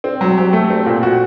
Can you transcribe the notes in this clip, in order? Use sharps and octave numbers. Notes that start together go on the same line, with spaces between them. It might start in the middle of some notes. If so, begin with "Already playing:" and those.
C4
F#3
G4
A3
C4
A#2
F#4